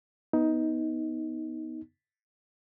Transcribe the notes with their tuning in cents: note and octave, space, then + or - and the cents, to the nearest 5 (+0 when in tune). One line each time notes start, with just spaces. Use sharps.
B3 +0 D#4 +15